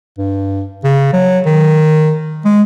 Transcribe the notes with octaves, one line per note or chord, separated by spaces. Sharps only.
G2
C#3
F#3
D#3
G#3